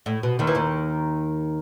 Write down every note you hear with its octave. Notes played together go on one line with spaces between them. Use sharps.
A2
B2
D#2 D#3
E3
D#2 D#3